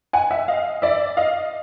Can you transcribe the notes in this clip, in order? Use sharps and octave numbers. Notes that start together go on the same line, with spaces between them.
F#5 G#5
E5 F#5
D#5 F5
D5 E5
D#5 F5